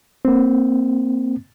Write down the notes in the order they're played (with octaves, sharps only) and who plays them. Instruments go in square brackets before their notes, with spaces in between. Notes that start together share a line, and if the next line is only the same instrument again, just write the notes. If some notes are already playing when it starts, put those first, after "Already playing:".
[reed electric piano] A#3 C4